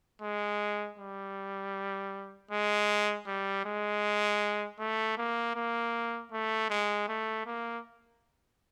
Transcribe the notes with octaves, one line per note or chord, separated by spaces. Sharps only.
G#3
G3
G#3
G3
G#3
A3
A#3
A#3
A3
G#3
A3
A#3